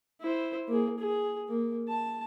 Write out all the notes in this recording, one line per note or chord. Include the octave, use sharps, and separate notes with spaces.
E4 C5
A#3 G#4
G#4
A#3
A5